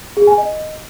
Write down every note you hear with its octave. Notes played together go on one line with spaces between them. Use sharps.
G#4
G#5
D#5